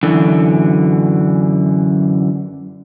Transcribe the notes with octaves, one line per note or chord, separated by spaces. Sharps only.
F#2 D3 E3